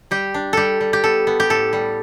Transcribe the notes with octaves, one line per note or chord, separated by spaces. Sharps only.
G3 G4
D4
G3 G4 A4
G3
G4
B3 A4
B3
G4
A2 A4
G3